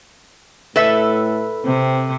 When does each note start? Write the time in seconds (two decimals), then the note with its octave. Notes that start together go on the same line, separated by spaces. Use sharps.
0.76 A2 A4 B4 E5
1.65 C3 C4